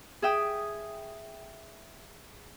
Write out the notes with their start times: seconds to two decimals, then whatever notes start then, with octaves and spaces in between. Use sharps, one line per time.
0.22 G#4 E5 G5 D#6